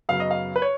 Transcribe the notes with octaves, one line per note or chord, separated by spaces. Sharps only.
F#2 C#3 F#3 B3 F5
D#5
F5
B4
C#5